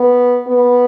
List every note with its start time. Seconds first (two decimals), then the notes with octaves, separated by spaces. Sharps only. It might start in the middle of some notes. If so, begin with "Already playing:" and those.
Already playing: B3
0.48 B3